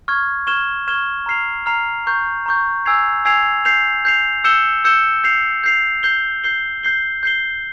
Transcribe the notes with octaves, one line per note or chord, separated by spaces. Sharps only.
C#6 F6 G#6
C#6 F6 G#6 E7 G7
C#6 F6 G#6 E7 G7
A#5 F6 C7 F7
A#5 F6 C7 F7
A#5 C#6 G6
A#5 C#6 G6
G#5 E6 G#6 C7 F7
G#5 E6 G#6 C7 F7
G6 C7 F7
G6 C7 F7
E6 G6 C#7 E7 G7
E6 G6 C#7 E7 G7
G6 C7 F7
G6 C7 F7
G6 C7 G7
G6 C7 G7
G6 C7 G7
G6 C7 G7